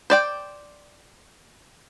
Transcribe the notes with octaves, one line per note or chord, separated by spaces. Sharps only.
C5 D5 G5